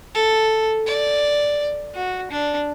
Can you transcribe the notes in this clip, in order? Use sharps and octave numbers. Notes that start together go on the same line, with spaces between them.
A4
D5
F#4
D4